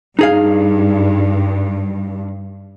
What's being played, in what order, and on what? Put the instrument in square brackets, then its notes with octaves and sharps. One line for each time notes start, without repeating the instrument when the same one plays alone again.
[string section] G2 [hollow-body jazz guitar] D#4 G#4 F5